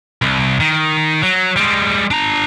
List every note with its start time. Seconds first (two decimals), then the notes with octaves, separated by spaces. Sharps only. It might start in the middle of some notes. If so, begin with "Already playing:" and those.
0.22 C2
0.60 D#3
1.22 F#3
1.56 G3 G#3
2.11 D4 A#5